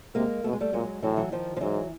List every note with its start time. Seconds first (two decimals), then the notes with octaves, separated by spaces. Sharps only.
0.15 C3 G#3 A#3
0.44 B2 A3
0.53 G#3
0.60 G3 A3
0.73 A#2 F#3 G#3
1.02 A2 E3 F#3
1.17 E3 F#3
1.32 D#3 F3
1.57 F3
1.60 G#2 E3 F#3